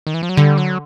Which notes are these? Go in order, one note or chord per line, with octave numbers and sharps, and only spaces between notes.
D#3
E3
F3
F#3
D3 G3
F#3